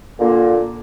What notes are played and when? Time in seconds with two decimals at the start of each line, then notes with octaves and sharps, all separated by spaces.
0.19 A#2 D3 A#3